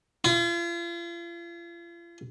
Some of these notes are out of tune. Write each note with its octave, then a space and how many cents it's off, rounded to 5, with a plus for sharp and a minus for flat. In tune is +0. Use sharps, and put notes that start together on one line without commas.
F4 -40